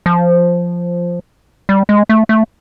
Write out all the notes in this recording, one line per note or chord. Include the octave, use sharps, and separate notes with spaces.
F3
G3
G#3
A3
A3